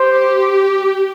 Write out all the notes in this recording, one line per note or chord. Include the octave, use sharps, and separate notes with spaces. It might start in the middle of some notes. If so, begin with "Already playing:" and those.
Already playing: G4 C5